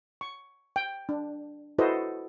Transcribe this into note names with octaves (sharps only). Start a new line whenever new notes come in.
C#6
G5
D4
E4 F#4 A4 B4 C5 D#5